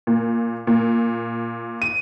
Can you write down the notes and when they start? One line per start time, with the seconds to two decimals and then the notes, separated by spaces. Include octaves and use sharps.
0.07 A#2
0.67 A#2
1.82 D#7